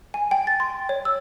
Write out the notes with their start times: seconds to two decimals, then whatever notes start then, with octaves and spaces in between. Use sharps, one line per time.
0.14 G#5
0.31 G5
0.47 A6
0.60 C6
0.89 C#5
1.05 E6